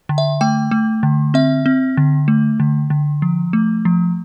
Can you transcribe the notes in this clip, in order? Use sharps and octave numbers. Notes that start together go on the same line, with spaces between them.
D3
E5
A3 G5
A3
D3
C4 E5
C4
D3
A3
D3
D3
F3
A3
F3